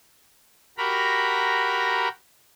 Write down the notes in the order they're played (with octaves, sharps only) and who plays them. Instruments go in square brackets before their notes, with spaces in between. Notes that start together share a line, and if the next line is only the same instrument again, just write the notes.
[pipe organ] F#4 G4 A#4 A#5 B5